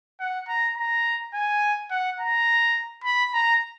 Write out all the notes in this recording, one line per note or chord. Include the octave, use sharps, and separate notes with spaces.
F#5
A#5
A#5
G#5
F#5
A#5
B5
A#5